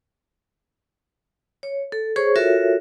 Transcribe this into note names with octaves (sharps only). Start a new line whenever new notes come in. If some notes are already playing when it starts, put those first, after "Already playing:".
C#5
A4
G#4 C5 C#5 C#6
F4 F#4 A4 A#4 C#5 E5